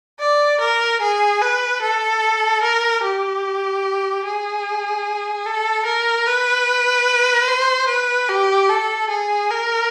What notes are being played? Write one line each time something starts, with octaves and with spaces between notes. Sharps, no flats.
D5
A#4
G#4
B4
A4
A#4
G4
G#4
A4
A#4
B4
C5
B4
G4
A4
G#4
A#4